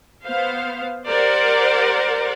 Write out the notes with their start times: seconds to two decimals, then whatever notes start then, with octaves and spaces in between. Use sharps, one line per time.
0.25 B3 C5 F5
1.08 G4 A#4 C5 D5 F#5